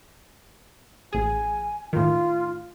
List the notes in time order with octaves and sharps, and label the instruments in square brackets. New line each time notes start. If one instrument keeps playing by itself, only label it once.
[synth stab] A1 G#4 [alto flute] G#5
[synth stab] A2 D#3 [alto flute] F4